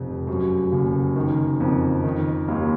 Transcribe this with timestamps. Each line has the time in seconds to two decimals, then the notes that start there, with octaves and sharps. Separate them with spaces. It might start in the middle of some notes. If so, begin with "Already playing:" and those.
Already playing: F1 F2
0.27 F#2
0.72 F#1
1.16 D#3
1.60 F2
2.04 D#3
2.48 D#2